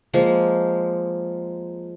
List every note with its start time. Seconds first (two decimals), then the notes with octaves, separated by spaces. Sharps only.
0.14 F3 G#3 A#3